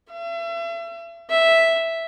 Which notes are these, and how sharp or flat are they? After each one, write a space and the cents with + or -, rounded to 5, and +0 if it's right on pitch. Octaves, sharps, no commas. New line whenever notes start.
E5 +35
E5 -5